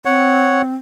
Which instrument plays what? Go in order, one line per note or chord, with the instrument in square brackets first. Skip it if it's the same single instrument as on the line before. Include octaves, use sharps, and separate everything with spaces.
[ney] C4 [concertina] C#5 F#5